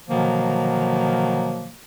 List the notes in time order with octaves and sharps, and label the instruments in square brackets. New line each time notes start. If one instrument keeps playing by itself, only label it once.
[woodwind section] B2 D3 D#3 F3 F#3 A#3